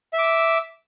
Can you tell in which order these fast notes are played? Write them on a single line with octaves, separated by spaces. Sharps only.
E5 D6 E6